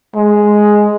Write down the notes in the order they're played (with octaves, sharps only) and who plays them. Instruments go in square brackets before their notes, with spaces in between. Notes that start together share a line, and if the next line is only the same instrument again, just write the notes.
[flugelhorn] G#3